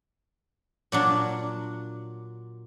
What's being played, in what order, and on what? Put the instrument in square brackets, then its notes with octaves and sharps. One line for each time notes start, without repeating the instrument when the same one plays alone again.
[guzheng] A#2 F#3 D4